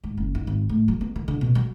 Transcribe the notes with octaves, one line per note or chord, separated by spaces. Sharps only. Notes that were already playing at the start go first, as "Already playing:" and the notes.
G#2
F#1
D#3
G#1
A2
F#3
B3
D#3
D3
B2
F#3